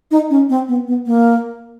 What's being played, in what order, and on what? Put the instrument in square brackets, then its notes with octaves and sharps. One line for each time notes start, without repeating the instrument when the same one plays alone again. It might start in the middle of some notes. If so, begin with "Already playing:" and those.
[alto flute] D#4
C#4
C4
B3
B3
A#3